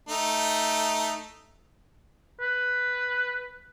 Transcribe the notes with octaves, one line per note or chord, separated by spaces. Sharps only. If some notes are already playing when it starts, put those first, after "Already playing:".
A3 D#4
B4